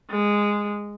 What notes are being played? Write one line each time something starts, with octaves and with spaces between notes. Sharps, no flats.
G#3